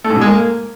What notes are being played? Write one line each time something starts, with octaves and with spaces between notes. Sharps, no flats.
A3
G#2
B2
G#3
A#3